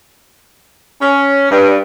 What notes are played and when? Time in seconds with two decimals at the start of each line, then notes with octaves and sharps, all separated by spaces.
1.02 C#4
1.51 G2